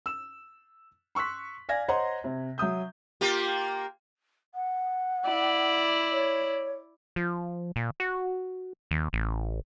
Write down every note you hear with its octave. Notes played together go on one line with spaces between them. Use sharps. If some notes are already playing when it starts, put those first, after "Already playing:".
E6 E7
C6 C#6 E6 F#6 B6
D5 F5 G#5 G#6 A#6
C5 C#5 D#5 F#5 A#5 C6
C3
F#3 E5 D#6 G6
A#3 F4 G4
F#5
E4 D5
C#5
F3
A#2
F#4
D#2
A1